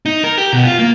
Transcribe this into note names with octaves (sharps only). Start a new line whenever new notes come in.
D#4
A#4
G4
B2
F4
A#3